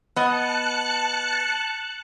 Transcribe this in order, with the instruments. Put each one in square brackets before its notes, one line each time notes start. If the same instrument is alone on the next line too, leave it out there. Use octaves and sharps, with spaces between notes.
[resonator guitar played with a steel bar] B3 D#5 [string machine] A5 F#6 C#7